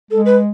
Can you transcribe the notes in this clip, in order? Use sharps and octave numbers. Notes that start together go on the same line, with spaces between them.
G#3 A4
B4